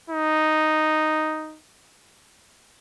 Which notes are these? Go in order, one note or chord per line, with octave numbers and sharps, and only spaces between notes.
D#4